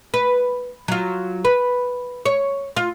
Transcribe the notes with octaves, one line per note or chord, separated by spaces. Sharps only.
B4
F#3 F4
B4
C#5
F4